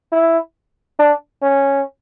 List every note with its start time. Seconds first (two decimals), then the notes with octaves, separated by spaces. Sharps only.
0.12 E4
0.99 D4
1.43 C#4